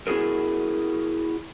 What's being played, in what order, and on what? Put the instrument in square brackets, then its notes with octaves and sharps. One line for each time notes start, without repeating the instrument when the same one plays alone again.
[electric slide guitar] B3 E4 F#4 G#4 A#4